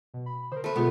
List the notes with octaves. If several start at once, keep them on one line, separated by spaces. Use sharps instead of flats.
B2
B5
D3 A#4 C5
A3 B4
B2 G#3 B3 F4 G#4 A4